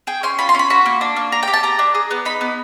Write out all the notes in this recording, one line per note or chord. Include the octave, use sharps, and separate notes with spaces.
G#4 G5
C#4 C6
F4 B5
C6
C#4 B5
F#4 B5
A#3
D4
A#3
D4 A#5
G4 G5
A5
G4 A#5
D4
G#4
B3
D#4 B5
B3